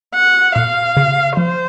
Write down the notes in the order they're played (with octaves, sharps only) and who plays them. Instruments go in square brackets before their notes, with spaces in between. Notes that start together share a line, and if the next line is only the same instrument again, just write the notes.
[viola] F#5
[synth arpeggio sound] A#2 [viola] F5
[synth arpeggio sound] C#3
[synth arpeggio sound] F3 [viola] C5